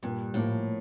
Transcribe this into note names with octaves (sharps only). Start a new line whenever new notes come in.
G2 A#2
A2 F3 A#3